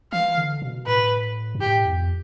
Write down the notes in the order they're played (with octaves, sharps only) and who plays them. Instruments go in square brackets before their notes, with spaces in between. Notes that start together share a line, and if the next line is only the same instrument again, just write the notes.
[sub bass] E3 [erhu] F5
[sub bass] D3
B2
[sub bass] A2 [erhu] B4
[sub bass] G2
[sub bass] A2 [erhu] G4
[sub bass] F2